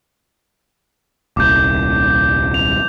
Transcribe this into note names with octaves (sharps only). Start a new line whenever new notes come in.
D#1 C2 D6 G6
F7